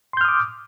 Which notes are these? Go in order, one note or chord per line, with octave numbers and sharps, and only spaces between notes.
C6 D6 D#6 F6 G6